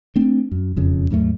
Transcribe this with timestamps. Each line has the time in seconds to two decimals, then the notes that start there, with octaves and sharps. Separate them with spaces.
0.16 A3 C4 D4
0.52 F#2
0.76 E1 F2 C#3
1.11 D#2 G#2 F#3 A3